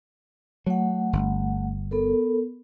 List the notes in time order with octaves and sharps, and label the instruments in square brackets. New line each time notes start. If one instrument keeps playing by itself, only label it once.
[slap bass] F#3 [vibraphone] A3 F#5
[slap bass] G1
[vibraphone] B3 A4 A#4